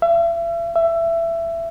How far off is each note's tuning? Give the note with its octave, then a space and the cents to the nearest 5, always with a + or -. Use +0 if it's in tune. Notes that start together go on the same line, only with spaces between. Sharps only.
E5 +40
E5 +20